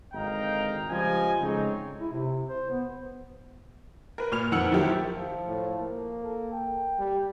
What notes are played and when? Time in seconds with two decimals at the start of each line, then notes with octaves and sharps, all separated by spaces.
0.14 G#1 D3 D#5 F5 G5 A#5
0.89 C#2 F3 G3 D#5 G#5
1.41 C#3 G#3 A3 C4 D#4 C#5
2.01 E4
2.13 C3
2.47 C5
2.71 B3
4.18 A#4 B4
4.32 A#2 B4 F6 F7
4.52 F2 D#3 F#5 E6 C#7 F#7
4.71 D#3 F3 F#3 E4 G4
5.14 F3
5.47 A2
5.81 A#3
6.23 A4
6.52 G5
6.99 G3